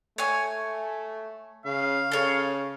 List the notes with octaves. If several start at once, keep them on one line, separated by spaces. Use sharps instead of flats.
A3 C#5 G#5
C#3 F5
C#3 A4 C#5